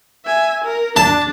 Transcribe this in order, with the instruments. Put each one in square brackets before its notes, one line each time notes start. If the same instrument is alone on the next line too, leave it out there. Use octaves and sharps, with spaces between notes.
[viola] E5 G#5
A#4
[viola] D4 [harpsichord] A5